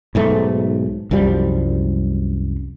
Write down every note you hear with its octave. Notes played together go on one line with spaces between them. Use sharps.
B1 G#2 A3
C2 F#2 F3 G3